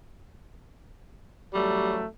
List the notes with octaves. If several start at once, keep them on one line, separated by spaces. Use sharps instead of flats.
A1 F#3 G3 A3